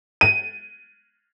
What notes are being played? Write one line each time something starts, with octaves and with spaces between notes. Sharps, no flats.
D#7